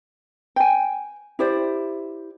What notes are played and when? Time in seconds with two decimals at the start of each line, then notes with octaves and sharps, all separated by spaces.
0.56 G5 G#5
1.39 E4 G4 C5 D5